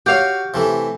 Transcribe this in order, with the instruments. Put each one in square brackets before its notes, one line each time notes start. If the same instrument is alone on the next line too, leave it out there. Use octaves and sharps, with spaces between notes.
[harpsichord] F#4 C#5 [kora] G4 F5
[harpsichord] C3 E3 A3